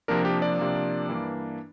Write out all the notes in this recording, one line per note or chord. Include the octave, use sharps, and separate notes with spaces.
C3 F3 A#3 D4 A#4
G4
D5
C3 F3 A#3 D4
G2 E3 A#3 D4